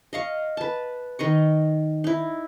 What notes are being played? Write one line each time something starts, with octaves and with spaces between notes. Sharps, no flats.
D#5 F5 C#6
B4 A5
D#3 D#5 C#6
D#4 E4